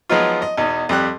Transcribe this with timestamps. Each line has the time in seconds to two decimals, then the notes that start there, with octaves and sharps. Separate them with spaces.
0.09 F3 F#3 G#3 B3 D#4 F4
0.42 D#5
0.57 E2 B2 D#4
0.89 F2 G3 G4 F#6